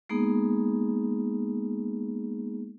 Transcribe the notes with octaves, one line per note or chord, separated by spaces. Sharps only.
G#3 A#3 B3 D#4 G#4